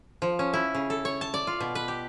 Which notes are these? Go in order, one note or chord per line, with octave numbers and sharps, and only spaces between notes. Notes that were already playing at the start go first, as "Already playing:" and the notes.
F3
C#4
E4
C#3
A4
C#5
A5
D5
F4
B2
B4
G4